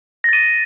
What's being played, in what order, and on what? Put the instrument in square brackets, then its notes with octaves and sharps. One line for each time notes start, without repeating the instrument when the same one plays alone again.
[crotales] A#6
A6
D#7